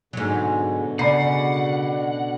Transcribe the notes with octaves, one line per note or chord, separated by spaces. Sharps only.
G#2 B2 D3 F#3
C#3 D5 F#5 B5 C7